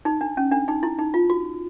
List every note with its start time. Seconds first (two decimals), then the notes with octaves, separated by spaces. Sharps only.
0.05 D#4
0.21 D4
0.37 C#4
0.52 D4
0.68 D#4
0.83 E4
0.98 D#4
1.14 F4
1.30 F#4